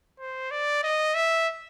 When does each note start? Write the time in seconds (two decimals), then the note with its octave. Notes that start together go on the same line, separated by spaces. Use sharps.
0.20 C5
0.51 D5
0.84 D#5
1.15 E5